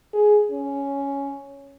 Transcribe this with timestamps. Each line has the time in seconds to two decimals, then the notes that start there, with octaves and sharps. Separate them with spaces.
0.13 G#4
0.51 C#4